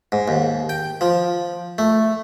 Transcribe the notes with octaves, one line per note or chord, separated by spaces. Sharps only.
G#2
D#2
G5
F3
A3